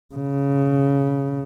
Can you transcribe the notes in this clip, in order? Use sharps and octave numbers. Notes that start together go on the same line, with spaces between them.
C#3